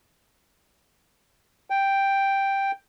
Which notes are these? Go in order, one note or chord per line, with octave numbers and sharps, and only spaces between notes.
G5